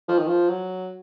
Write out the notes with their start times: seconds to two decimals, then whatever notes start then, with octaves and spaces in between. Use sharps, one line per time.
0.08 F3
0.18 D#3
0.27 F3
0.49 F#3